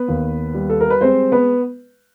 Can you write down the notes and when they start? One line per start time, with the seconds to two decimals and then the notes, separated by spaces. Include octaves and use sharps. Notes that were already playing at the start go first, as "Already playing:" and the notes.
Already playing: B3 B4
0.08 D#2
0.54 G3
0.69 A4
0.81 A#4
0.90 B4
1.01 G#3 C4 C5
1.32 B3 B4